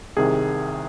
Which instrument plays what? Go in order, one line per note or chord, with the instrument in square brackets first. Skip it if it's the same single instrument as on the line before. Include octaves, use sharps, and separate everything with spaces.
[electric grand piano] C2 C3 D#3 G#4